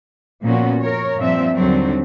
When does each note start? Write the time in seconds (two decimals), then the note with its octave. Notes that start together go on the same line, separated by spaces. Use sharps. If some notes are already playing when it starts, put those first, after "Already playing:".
0.43 A#2 F3 B3 C#4 F#4
0.82 A#4 C#5
1.19 G2 A#2 F3 C4 E5
1.54 D#2 D3 F#3 G3 C4